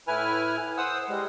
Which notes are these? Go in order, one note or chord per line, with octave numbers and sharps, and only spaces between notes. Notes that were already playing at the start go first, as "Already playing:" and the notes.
A2 E4 B4 G#5 F6
C5 F#5 D#6 E6
G3 G#3